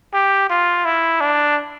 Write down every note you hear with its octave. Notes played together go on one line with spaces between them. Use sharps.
G4
F4
E4
D4